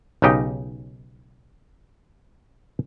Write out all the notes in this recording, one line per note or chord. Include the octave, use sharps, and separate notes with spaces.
B1 C#3 D#4 G4 D#5